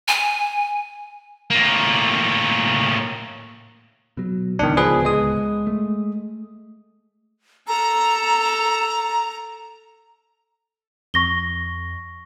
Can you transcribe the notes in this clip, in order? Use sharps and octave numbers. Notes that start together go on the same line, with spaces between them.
G#5
A2 A#3
B2 F#3
D1 C#2 D#3 B3 D4
F3 G#4 B4
G#3 D#6
A3
A4 A#5
F2 C#6 A#6 G7